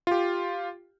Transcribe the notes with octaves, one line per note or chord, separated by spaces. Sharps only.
F4 G4